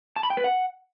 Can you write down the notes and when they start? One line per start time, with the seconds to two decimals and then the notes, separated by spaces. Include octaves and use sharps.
0.16 A5
0.23 B5
0.30 G5
0.37 B4
0.44 F#5